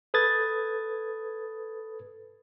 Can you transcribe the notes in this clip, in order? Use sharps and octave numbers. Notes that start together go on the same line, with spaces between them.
A4 B4 D#6 G#6 A6